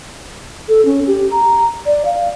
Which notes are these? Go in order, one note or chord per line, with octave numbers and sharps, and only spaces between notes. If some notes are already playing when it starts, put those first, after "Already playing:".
A4
C#4
G4
A#5
D5
F5